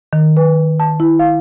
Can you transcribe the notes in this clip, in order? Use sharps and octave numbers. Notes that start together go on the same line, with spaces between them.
D#3
B4
A5
E4
F5